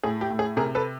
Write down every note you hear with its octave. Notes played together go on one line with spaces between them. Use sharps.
A2 G#4
G4
A2
G#4
C3 G#4 A#4
A4 B4